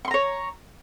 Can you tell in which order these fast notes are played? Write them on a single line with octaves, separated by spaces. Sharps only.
C#6 C6 A#5 C#5